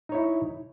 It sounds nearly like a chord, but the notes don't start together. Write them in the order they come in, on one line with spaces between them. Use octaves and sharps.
D#4 C#5 E4